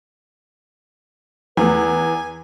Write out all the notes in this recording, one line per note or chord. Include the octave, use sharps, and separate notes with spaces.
E2 F3 A3 B4 G#5